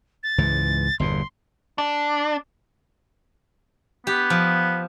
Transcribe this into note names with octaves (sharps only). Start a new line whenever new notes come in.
A6
C#2 G#2 E3
G1 E2 A#2 C6
D4
B3 G4
F3